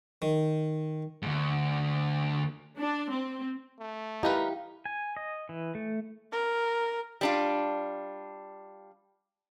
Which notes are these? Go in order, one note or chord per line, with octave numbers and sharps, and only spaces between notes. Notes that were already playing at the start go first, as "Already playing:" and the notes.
D#3
D2 G#2
D4
C4
A3
D#4 E4 G4 A#4 B4 F5 G5
G#5
D#5
E3
A3
A#4
G3 D4 F4